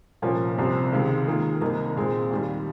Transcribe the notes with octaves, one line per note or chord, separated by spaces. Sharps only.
C2 A#2 F3 A#3 C#4
C2 C3 F3 C4
C#2 C3 D#3 G#3
D#3 A#3 F4 G#4
C2 C3 D#3 A#3 D#4
A#2 G#3 C4
D#2 D#3 G3